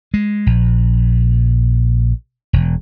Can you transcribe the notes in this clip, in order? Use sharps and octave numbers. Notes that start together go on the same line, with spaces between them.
G#3
A#1
E1